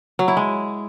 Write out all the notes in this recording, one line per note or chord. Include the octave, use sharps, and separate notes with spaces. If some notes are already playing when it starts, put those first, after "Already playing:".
F#3
E4
G#3